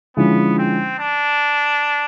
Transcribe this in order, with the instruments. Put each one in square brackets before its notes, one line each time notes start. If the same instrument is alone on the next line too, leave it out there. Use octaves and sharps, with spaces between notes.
[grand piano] D3 F3 G#3 C#4 E4 [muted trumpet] B3
[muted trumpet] C4
D4